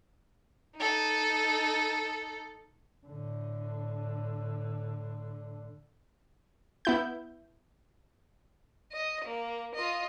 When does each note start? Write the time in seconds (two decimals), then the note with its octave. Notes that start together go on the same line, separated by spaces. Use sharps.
0.77 D#4 A4
3.07 A2 D3
6.85 B3 E4 G6
8.93 D#5
9.24 A#3
9.75 F4 D#5